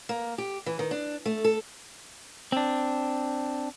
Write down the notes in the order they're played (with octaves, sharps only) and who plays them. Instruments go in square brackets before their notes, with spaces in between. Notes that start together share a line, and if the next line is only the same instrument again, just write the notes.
[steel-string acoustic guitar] A#3
G4
E3
D#3
D4
A3
A4
[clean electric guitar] C4 D4